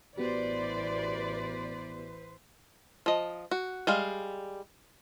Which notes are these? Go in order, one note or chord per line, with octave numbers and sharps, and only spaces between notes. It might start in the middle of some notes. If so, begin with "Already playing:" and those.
A1 E3 B3 F#4 G4 B4 C5 D5
F3 D#5
F#4
G3 G#3 F5